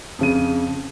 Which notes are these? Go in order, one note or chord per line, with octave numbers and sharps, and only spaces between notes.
F2 C#3 D#7